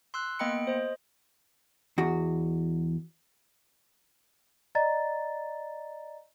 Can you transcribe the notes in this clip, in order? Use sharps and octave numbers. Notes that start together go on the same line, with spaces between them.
C6 E6 F#6
A#3 B3 D#5 G5 B5 C#7
C5 D#5
E2 F#4
D5 D#5 A#5 A6